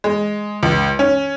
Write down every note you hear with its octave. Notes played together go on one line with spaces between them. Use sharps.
G#3
C#2
C#4